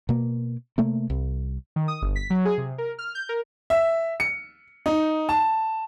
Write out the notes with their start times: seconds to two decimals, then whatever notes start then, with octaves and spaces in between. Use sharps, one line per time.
0.09 B2 A#3
0.78 C3 A3 A#3
1.10 C2
1.76 D#3
1.88 D#6
2.02 G1
2.16 B6
2.30 F#3
2.45 G#4
2.58 C3
2.78 A#4
2.99 F6
3.15 G6
3.29 A#4
3.70 E5
4.20 C#7
4.86 D#4
5.29 A5